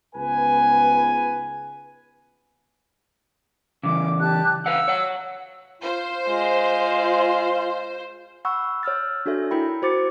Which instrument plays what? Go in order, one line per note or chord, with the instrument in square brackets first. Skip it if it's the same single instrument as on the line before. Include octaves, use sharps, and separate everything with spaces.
[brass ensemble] C#2 G#2 B3 B4 G#5
[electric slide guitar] C#3 E3 [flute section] D6
[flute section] G4 A5 F#6
[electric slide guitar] B4 F5 F#5 [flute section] E6
[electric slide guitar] C#5 F#5
[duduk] F4 [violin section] C5
[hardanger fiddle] G#3 [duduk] F4
[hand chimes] F#5 B5 C#6 E6 F#6
C#5 E6 F6 A6
D4 F#4 A4 C#5 E5
E4 A#4 G5 B5
F#4 C5 D6 A6 C#7